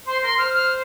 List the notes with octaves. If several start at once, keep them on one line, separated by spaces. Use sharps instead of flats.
C5 C6
A#4 C6
C5 F6
F6